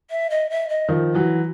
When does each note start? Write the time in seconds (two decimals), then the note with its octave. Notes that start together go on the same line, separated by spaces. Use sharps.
0.11 E5
0.30 D#5
0.50 E5
0.69 D#5
0.89 D#3 F3
1.14 E3 F#3